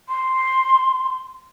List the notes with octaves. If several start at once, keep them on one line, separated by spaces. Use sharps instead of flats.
C6